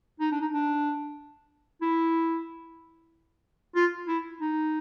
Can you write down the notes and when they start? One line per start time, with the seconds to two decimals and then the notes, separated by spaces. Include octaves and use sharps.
0.20 D#4
0.32 D4
0.41 D#4
0.53 D4
1.82 E4
3.75 F4
4.08 E4
4.41 D#4